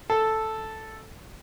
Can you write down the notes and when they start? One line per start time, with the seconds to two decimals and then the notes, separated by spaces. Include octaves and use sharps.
0.10 A4